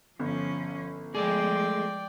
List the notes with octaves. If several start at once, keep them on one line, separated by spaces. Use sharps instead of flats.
G1 F3 C#4
F3 G#3 A3 G#4 D5 G5